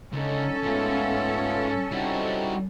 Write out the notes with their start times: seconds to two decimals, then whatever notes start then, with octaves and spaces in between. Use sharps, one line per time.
0.13 C#2 D3 C#4 D#4 A4
0.64 G#2 G#3 A3 B3 F4
1.92 G3 C4 D#4 E4 F#4